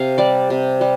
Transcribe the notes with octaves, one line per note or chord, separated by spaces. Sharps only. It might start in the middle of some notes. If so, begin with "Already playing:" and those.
Already playing: C3 F5
G3 D5
C3
G3